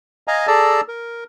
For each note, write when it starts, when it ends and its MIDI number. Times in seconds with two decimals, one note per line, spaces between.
0.28 0.47 75
0.28 0.47 77
0.28 0.47 80
0.28 0.47 82
0.47 0.81 68
0.47 0.81 69
0.47 0.81 74
0.47 0.81 81
0.47 0.81 82
0.47 0.81 88
0.88 1.24 70